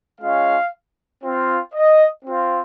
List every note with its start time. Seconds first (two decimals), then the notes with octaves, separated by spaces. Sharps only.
0.21 G#3 C#4 F4 F5
1.23 C4 F4
1.74 D#5
2.25 C4 F4